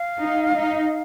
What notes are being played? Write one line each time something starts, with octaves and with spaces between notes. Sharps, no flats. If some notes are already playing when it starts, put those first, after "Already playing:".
Already playing: F5
D#4
D#4